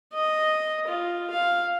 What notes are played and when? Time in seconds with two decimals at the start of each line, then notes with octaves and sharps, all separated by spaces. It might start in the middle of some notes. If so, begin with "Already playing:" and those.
0.14 D#5
0.88 F4
1.31 F5